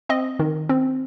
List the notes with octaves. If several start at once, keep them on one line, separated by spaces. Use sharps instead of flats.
C4 D#5
D#3
C4